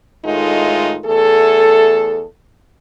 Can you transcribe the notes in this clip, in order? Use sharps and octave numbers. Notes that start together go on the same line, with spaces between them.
A2 D#3 G#3 A3 D#4 F4
E2 A3 G#4 A4